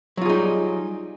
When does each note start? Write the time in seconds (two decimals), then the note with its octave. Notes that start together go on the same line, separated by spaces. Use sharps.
0.17 F#3
0.21 F4
0.25 G#4
0.29 D#4
0.33 G3